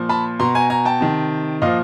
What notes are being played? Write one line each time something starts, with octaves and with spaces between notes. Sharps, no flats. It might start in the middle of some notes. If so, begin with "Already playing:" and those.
Already playing: A#2 F3
A5 B5
B2 A#5 C6
G#5 A#5
G#5 A#5
G5 A5
C3 D#3
A#2 F3 D#5 F5